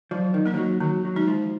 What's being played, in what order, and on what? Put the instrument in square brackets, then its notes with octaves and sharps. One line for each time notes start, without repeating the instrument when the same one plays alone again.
[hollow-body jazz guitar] F3 [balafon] F#3
[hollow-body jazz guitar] D#3
[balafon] A#3 D#4
[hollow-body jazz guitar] F3
F#3
[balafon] D#3 [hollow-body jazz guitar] F#3
[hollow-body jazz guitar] F#3
[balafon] G#3 D#4
[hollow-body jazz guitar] F3